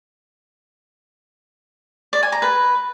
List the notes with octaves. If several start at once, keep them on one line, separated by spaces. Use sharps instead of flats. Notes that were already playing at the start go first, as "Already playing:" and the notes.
D5
G#5
A#5
B4